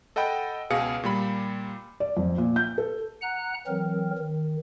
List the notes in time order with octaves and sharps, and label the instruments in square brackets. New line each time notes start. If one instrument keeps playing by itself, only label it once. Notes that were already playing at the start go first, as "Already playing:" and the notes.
[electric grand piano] A4 D#5 F#5 G5 B5
C#2 B2 G#4 F5 C#7
A#2 G3 B5
[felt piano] D5
F2
A#2
G6
A4
[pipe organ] F#5 A#5 F#6
E3 F#3 C4 A#4
D#3